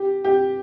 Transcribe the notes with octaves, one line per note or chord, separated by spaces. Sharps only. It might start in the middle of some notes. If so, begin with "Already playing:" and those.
Already playing: G4
G4